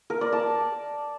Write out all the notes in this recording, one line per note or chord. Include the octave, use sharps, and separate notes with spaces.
A#4
D5
A5